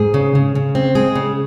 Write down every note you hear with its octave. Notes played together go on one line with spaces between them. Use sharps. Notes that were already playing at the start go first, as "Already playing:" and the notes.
Already playing: G#2 G#4
C#3
C#3
C#3
C4
G#3 G#4
C#3